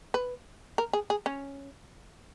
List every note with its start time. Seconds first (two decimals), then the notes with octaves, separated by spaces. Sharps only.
0.14 B4
0.78 A#4
0.93 G#4
1.10 G#4
1.26 C#4